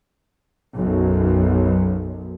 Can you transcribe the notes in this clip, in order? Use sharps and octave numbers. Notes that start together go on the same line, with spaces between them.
B1 F#2